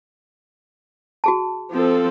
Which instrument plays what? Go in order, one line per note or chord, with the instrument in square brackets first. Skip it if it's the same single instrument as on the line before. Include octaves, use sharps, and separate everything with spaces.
[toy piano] F#4 G#4 A5
[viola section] F3 C4 A4